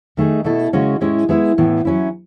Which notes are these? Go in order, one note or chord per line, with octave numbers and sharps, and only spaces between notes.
D#3 A3 D#4 G#4
B2 A3 E4 A4
C#3 G#3 C#4 F#4
A2 G#3 C#4 E4 G#4
G#3 B3 E4 G#4
A2 E3 B3
F#3 C#4 E4